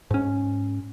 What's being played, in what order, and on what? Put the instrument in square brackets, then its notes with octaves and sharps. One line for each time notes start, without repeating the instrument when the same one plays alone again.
[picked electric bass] G#2 C#4